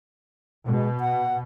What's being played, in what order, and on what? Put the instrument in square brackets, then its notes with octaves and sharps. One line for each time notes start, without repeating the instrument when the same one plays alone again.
[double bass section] B2 [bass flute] G#3
[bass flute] F#5